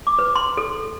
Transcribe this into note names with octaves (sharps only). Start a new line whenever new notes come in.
D6
B4
C6
A4